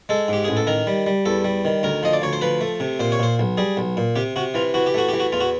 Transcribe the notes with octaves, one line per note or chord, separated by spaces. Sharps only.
G#3 A4
G#2 G4
A1 G#4
A4
D#3 A#4
G3
G3
E2 A4
G3
D#3
D2 A#4
F3 D#5
D5
D2 C#5
C5
F3 B4
A3
C3
A#2 C5
C#5
A#2 C5
B1
G3 G#4
B1
A#2
C3 G4
C3 F#4
E3 F4
E3 F#4
G4
A3 F#4
E3 G4
F#4
E2 F4
F#4